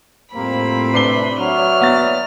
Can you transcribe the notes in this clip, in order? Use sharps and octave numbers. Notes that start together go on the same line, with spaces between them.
F2 A2 G3 A#3 C4 B5
C3 A3 D4 B4 D5 C7 G7
F#3 C#5 D5 E5 F6
B3 A6